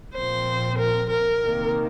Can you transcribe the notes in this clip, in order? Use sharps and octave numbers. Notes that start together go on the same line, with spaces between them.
A#2 F3 C4 C5
A#4
A#4
C3 D#3 A#3